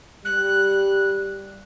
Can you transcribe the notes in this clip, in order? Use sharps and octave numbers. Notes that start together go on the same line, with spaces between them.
G3 F#6